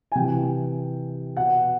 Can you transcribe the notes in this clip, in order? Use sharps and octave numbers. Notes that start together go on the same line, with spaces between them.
G#5
C3 E3 G5
B2 F#5